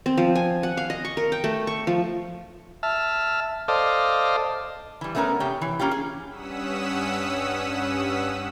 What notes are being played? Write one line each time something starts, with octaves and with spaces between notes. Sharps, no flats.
C4
F3
G#5
F#5
F5
D#5
C#6
A#4
G5
A3
C#6
F3
E5 A5 F6
A4 C5 D5 D#5 F5
E3 G3
A3 B3 C#4 D4 A#4
C3 G4 C#5
E3
A#3 C#4 F4 G4
G#4
G2 C#4 F#5 D#6 E6 B6